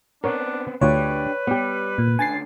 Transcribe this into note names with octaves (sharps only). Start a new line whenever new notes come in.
B3 C4 D4 A#4 C#5 F#5
D2 D4 F4 G4 B4 C#5 D5
G3 B3 G4
A#2
C#2 D3 G#5 A6 C7